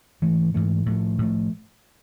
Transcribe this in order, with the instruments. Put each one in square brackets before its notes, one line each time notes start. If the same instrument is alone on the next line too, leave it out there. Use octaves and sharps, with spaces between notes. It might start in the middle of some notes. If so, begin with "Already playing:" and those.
[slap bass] G#2 E3 A3
G#2 E3 A3
A2 F3 A3
A2 F3 A3